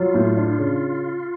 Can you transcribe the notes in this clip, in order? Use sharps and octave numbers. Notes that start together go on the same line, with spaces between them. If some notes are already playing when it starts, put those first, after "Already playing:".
Already playing: F#3 F4
A2
D4
C#3